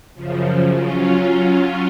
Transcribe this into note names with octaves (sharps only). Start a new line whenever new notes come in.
F#2 C#3 F3
F#3 C#4 F4